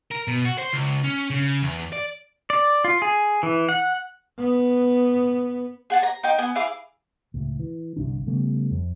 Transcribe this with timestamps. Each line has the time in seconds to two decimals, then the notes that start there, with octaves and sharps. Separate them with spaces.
0.11 A#4
0.28 B2
0.45 F#4
0.59 C5
0.73 C#2
1.04 C#4
1.30 C#3
1.62 E2
1.93 D5
2.50 D5
2.84 F4
3.02 G#4
3.43 E3
3.69 F#5
4.39 B3
5.90 G#4 F#5 A5
6.03 A#5
6.23 D#4 G5
6.38 B3 G#5
6.55 E4 G#4 F5 D6
7.34 C#2 A2
7.60 E3
7.96 G1 C2 D4
8.27 C#3 G3 A3 B3
8.71 F2